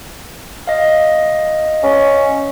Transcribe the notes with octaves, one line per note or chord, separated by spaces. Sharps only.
D#5 F5
C#4